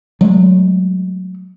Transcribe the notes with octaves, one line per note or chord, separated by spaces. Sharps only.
F#3 G#3 A3